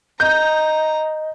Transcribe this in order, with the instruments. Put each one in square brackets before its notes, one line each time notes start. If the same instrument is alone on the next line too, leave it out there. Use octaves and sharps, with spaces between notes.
[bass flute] D#5 [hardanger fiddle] A#5 [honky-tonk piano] G6